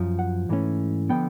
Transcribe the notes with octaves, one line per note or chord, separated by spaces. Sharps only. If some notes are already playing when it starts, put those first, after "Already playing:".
Already playing: F#2 F3
F#5
G#2 E3 A3 C#4
D3 F3 B3 G5